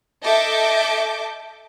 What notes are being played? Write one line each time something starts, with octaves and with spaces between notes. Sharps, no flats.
A4 D#5 E5 A5 D6 G6